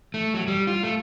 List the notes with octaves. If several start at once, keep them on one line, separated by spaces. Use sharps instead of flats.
A3
F#3
G3
F4
A3